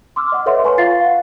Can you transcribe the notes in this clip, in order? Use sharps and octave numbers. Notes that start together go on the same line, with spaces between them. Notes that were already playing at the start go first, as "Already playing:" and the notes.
C6 D6 E6 F6
D#5 F#5
A4 B4 C#5 E5 F#5 C6
B4 C#5 G#5 A#5 C6 C#6
F4 F5 A6 C7
F5 F#5